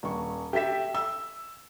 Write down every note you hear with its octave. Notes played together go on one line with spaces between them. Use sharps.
D#1 C#6
G4 A4 E5 B6 E7
E6